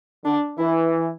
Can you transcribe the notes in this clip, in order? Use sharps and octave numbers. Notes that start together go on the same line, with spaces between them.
D3 D4
E3 E4